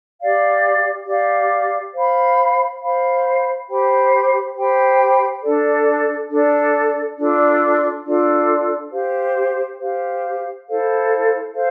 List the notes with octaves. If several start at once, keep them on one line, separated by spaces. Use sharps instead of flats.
G4 D5 F5
G4 D5 F5
C5 F5 B5
C5 F5 B5
G4 C5 G5 B5
G4 C5 G5 B5
D4 A4 D5
D4 A4 D5
D4 F4 A4 D5
D4 F4 A4 D5
G4 C5 F5
G4 C5 F5
E4 A4 C5 F5
A4 C5 F5